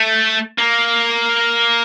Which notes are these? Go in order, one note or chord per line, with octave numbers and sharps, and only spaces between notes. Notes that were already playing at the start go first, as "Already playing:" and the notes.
Already playing: A3
A#3